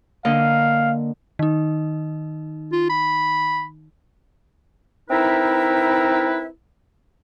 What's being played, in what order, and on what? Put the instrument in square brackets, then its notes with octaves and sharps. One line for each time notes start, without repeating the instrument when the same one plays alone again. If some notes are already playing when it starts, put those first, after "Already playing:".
[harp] D3 A#3 D#5 [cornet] F5
[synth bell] D#3 D#4
[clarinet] F4
B5
[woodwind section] C4 D#4 E4 A#4 B4 E5